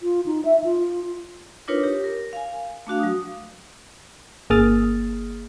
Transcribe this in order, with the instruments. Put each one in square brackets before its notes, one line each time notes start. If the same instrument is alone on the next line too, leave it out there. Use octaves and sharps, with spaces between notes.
[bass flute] F4
D#4
E5
F4
[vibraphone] D4 D#4 F4 A#4 B4 C#5
G4
A#4
F5 G#5
A3 D4 F#4 F5
F#3 D#6
[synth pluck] G1 A#3 G#4 D#6 F6 A6